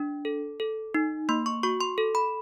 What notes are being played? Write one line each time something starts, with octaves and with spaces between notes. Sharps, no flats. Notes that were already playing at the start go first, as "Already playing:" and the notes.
Already playing: D4
A4
A4
D#4
A#3 C6
C#6
F#4 C#6
C6
A4
B5